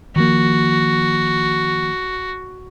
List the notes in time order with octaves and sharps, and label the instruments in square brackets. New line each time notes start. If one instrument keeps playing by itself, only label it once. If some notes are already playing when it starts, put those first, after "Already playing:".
[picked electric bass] D#3 F3 A#3 [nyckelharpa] F#4